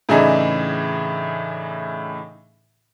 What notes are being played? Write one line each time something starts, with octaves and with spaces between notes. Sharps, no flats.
A2 C#3 E3 D4 D#4 G#4